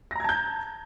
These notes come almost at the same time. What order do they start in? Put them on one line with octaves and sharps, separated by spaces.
A#6 A#5 G#6 A5 G6